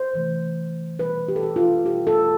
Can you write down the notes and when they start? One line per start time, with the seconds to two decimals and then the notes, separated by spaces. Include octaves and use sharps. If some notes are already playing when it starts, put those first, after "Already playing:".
Already playing: C5
0.14 C3 E3 A3
0.99 B2 G3 B4
1.28 G4
1.36 A4
1.43 G4
1.56 F4
1.85 B2 G3 G4
2.07 A4